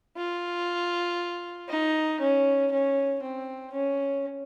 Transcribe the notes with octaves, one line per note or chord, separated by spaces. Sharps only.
F4
D#4
C#4
C#4
C4
C#4